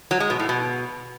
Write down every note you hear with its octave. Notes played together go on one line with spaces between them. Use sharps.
F#3
G#3
B2
A2
B2